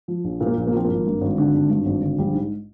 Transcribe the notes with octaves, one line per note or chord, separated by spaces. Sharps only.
F3
A#1
A#2
A#3
A#1
A#3
F3 C4
G#1 A#3
G2
G#1
D3
G#1
G2
G#1
D3
A#1 G3
G#2